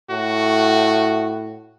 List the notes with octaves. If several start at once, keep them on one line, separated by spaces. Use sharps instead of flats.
A2 F#4